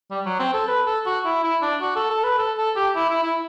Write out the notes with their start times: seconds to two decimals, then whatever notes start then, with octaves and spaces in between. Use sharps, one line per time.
0.10 G3
0.26 F#3
0.39 C4
0.54 A4
0.68 B4
0.86 A4
1.06 F#4
1.25 E4
1.44 E4
1.62 D4
1.81 F#4
1.96 A4
2.10 A4
2.24 B4
2.38 A4
2.58 A4
2.76 G4
2.95 E4
3.09 E4
3.23 E4